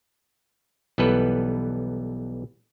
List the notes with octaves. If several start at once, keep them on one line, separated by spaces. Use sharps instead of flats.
B1 E3 G3 B3 A4 B4